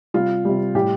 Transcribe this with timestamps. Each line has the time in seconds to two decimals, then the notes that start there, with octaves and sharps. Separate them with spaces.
0.14 C3 G3 F4
0.45 C3 G3
0.75 A2 G3 G4